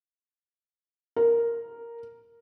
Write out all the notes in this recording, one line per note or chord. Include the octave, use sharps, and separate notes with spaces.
A#4